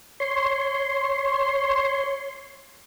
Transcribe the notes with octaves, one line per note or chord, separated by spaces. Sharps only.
C#5 C6